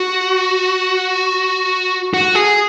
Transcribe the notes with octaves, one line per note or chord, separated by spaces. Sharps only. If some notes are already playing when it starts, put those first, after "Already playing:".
Already playing: F#4
F#4
G#4